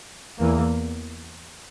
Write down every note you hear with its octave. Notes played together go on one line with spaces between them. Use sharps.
E2 E3 A#3